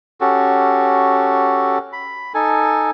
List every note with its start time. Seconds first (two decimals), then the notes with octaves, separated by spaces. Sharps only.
0.21 C#4 F#4 G4 A4
1.93 B5
2.34 D#4 A4 G#5